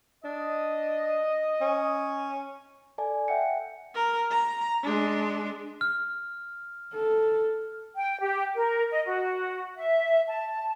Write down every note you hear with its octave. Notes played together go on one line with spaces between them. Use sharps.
D4 D#5
C#4
A4 D5 G#5 A5
E5 F#5 G5 C#7
A#4
A#5
G#3 D4
F6
A4
G5
G4
A#4
D#5
F#4
E5
A5